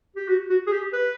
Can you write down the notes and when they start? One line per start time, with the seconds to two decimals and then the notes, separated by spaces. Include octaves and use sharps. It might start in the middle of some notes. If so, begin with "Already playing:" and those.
0.16 G4
0.29 F#4
0.50 F#4
0.67 G#4
0.72 G4
0.93 B4